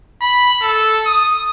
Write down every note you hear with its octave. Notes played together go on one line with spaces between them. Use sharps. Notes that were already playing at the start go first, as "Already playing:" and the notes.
B5
A4
D#6